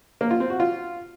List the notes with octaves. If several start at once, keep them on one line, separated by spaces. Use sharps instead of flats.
A#3
F4
C4
F#4
F4